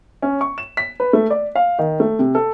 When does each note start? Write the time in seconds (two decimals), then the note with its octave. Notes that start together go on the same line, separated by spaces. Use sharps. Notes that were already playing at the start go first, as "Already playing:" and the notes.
0.22 C#4
0.41 C#6
0.58 E7
0.77 B6
1.00 B4
1.13 A3
1.30 D5
1.55 F5
1.79 D#3
2.00 A3
2.19 C3
2.35 A4